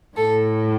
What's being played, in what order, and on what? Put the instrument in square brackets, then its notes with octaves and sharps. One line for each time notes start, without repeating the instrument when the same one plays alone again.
[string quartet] A2 A4